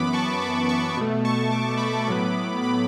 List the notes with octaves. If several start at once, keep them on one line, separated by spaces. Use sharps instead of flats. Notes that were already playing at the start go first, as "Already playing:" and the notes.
Already playing: F#2 E3 B3 B5 D6
A5 C#6
B5 D6
A5 C#6
B2 A3
A5 C#6
D6
B5 D6
A2 F#3 B3
B5 D6